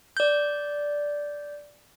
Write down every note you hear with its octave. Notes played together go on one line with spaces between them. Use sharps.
D5 G6